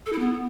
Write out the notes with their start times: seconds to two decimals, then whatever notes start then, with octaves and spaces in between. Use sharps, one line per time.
0.06 A4
0.12 E4
0.19 B3